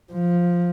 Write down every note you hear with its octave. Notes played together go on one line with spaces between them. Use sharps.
F3